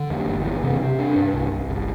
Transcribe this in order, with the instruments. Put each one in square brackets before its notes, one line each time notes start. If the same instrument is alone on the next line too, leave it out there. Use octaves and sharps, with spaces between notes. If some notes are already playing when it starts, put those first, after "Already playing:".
Already playing: [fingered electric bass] D3
E2
G1
E3
C3
C3
D4
G2
C2
C2
G1